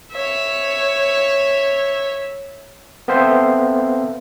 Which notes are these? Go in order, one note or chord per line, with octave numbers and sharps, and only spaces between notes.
C#5 E5
B3 C4 A4 C5 E5 F5